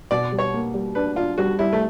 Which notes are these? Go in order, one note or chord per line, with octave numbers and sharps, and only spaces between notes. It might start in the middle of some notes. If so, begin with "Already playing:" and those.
B2 D5
G3
C#5
A#3
G3
D4 B4
D4 F4
G3 F#4
G3 E4
A3